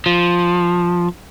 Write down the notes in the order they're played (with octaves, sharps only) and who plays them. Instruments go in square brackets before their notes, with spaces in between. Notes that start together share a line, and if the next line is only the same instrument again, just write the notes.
[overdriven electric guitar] F3